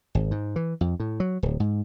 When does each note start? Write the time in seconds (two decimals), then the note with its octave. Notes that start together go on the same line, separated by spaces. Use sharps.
0.15 G#1
0.31 G#2
0.56 E3
0.81 F2
1.00 A2
1.20 F#3
1.43 D1
1.60 G#2